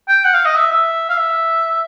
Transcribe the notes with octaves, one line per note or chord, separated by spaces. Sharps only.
G5
F#5
F5
D#5
E5
E5
F5
E5